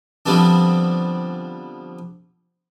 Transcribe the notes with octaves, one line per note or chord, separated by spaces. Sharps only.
D3 F3 G3 B3 C4 D4